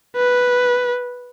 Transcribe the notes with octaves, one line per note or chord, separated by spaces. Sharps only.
B4